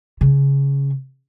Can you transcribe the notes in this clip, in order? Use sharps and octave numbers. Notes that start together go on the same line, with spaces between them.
C#3